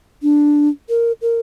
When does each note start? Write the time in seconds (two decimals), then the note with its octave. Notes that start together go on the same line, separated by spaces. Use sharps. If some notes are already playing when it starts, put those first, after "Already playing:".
0.22 D4
0.89 A#4
1.22 A#4